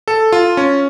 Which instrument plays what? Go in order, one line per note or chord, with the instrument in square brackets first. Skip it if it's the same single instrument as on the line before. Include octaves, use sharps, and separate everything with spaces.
[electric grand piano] A4
F4
C#4